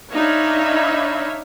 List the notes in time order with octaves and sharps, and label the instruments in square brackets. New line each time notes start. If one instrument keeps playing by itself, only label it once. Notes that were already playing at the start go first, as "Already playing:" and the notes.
[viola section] D4 D#4 C#5 E5 F5 B5